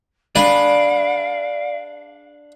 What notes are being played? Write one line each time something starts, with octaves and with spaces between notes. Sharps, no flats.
D4 G#4 B4 D5 F5